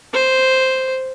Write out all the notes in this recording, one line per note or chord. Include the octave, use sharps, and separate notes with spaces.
C5